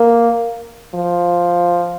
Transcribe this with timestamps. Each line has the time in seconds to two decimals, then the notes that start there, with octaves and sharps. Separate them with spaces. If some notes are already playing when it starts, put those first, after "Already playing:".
Already playing: A#3
0.95 F3